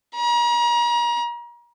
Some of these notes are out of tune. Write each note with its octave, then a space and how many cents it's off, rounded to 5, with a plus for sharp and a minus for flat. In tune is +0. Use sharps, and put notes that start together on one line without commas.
A#5 +40